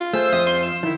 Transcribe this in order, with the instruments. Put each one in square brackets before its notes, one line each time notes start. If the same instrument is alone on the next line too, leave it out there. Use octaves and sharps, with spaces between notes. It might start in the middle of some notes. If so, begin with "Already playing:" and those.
[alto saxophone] F4
[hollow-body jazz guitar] A3 G#4 [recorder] C5 [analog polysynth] E6
[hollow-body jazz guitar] F2 E5 [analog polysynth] D#6
[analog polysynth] C6
E7
[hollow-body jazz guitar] D#3 F3 [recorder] E4